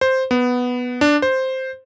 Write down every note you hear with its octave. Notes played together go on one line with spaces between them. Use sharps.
C5
B3
D4
C5